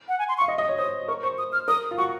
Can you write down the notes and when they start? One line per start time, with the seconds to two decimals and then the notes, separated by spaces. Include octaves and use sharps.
0.09 F#5
0.19 G#5
0.29 C6
0.38 C#6
0.41 F5
0.48 D#5
0.58 D#5
0.63 D#6
0.69 C#5
0.78 C5 D#6
1.08 A#4 C#6
1.23 C5 C#6
1.38 D#6
1.53 F6
1.68 A#4 D#6
1.91 F4
1.98 F#4 C#6